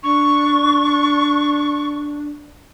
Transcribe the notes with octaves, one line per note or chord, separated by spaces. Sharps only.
D4 C#6